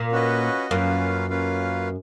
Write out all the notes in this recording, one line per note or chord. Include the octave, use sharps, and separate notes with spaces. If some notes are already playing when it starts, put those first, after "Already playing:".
Already playing: A#2
C#4 F#4 B4 D#5
F#2 A#3 C#4 F4 B4 F5
A#3 C#4 F4 B4 F5